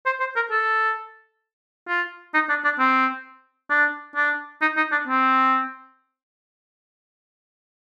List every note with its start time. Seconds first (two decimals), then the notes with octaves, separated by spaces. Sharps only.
0.06 C5
0.20 C5
0.35 A#4
0.51 A4
1.88 F4
2.34 D#4
2.49 D4
2.64 D4
2.79 C4
3.70 D4
4.15 D4
4.61 D#4
4.77 D#4
4.91 D4
5.07 C4